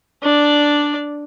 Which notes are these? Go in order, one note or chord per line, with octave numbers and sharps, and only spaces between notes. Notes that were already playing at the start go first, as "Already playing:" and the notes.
D4 D5